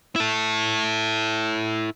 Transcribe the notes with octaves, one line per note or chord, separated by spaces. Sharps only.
E4 A4